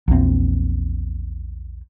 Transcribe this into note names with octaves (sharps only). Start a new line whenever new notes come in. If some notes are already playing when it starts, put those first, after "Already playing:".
A#1 E2 C4